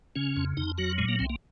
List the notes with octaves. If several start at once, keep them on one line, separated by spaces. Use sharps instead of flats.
C#3 C#4
F2
F2 D#4
F#3 F#4
A#2 G#3
A#3
C2 C4
A#3